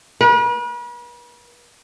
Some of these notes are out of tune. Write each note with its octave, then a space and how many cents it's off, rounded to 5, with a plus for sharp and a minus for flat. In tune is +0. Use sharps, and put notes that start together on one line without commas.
B4 -40